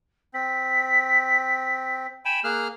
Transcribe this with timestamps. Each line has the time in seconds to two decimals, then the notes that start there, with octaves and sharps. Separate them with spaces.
0.34 C4 B6
2.25 G5 G#5 B5 E7
2.44 A#3 G#4 F6 F#6